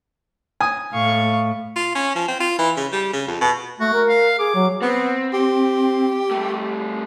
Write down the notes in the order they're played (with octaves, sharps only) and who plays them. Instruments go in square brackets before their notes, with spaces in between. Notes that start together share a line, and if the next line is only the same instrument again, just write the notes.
[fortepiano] G#5 D#6
[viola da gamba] A2 [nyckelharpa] F5 C#6
[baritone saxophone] F4
C#4
F3
C4
F4
E3
C#3
G3
C#3
F2
B2
[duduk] A3 [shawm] F#4
[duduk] A#4
[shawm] F5
[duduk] G#4 [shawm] D6
[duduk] F#3
[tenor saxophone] B3 [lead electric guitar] C4
[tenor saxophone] G4
[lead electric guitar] G3 A3